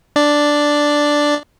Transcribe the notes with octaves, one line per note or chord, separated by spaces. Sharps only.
D4 D5